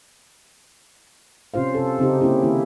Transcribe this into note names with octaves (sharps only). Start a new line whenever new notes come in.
C3 C#4 F4 C5 F5
C3 A4
C#3 C4 D#4 G4
A#3 C4 C#4 E4 G4
D#3 A#3 E4